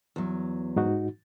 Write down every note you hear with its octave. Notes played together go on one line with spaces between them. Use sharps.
E2 F#3
G#2 D#4 F#4